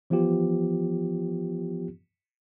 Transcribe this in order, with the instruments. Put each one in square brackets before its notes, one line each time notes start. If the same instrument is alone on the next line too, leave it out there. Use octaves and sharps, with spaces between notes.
[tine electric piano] E3 F3 B3 F4 G4